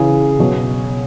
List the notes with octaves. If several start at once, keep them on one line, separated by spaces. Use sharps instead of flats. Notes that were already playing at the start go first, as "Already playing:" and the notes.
Already playing: C#3 E3 G#4
B2 F#3